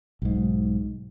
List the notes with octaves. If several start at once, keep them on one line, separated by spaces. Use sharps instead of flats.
B1 G#2